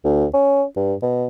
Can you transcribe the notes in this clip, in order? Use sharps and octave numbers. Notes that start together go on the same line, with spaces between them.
D2
C#4
G2
B2